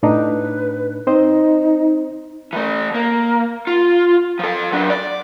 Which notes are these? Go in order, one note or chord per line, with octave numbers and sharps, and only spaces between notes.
A2 D4 D#4 B4
C4 D#4 C5 D#5
E3 A3
A#3
F4
F3 A4
F#3 D4
D5